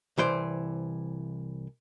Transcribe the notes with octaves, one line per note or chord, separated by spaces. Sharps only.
C2 E3 C5 D5